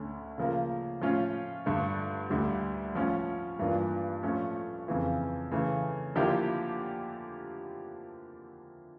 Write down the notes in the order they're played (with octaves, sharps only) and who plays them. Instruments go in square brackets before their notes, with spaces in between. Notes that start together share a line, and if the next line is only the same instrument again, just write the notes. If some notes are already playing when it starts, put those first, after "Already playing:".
Already playing: [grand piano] D2 D3 A3 C#4
C#3 F3 A#3
A2 F3 C#4 F4
G2 D3 A3
D2 D3 G3
A2 F3 C#4
G2 E3 A#3 D4 F4
A2 F3 A3 C#4
F2 C#3 E3
C#3 E3 A3
D3 F3 A#3 E4 G4